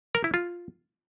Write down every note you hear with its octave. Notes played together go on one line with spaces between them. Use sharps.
A#4
E4
F4